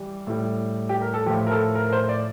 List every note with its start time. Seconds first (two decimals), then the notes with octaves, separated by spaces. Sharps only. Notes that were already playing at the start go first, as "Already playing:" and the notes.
Already playing: E3 G3
0.27 A2 G3
0.89 G4
1.01 A#4
1.14 A4
1.26 F3 G4
1.30 A2
1.47 A#4
1.51 A4
1.75 A#4
1.87 A#4
1.93 C5
2.09 D5